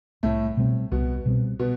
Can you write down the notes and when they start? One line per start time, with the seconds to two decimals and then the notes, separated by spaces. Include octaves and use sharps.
0.23 C2 A2 A3
0.57 B2 G3 C4
0.92 C2 B2 B3
1.26 B2 G3 C4
1.59 B2 B3